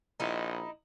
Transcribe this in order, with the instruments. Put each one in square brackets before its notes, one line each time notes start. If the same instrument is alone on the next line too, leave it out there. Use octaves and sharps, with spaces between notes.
[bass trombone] A#1 [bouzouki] D#4 E4